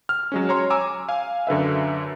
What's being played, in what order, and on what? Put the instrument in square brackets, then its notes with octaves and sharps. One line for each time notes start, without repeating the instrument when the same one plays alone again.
[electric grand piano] F6
F#3 G#3 C#4
C#5 A#5 C6
G#5 A#5 D6 E6
F5 G#5
F#2 D3 B4 E5